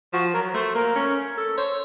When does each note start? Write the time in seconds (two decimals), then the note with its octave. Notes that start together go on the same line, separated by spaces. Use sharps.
0.13 F3 F#4
0.34 F#3 A#4
0.54 A3 C5
0.75 A#3 A#4
0.96 C#4
1.37 A4
1.57 C5 C#5